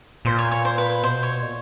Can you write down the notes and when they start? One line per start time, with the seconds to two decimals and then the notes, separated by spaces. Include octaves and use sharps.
0.25 A#2 C5
0.39 C#5
0.51 C#5
0.65 C5
0.78 B4
0.90 B4
1.03 B2 C5
1.23 C#5
1.42 A#2